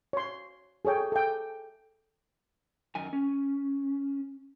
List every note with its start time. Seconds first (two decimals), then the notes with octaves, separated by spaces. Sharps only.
0.13 C#5 C6
0.85 G#4 A4 C#5 G5
1.12 A4 G5
2.95 F#2 D#3 G#5
3.13 C#4